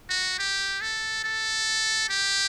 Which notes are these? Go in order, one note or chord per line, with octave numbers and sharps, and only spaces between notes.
F#4
G4
A4
A4
G4